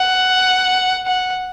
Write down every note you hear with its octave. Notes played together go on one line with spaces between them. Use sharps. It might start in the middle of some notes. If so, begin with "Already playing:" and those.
Already playing: F#5
F#5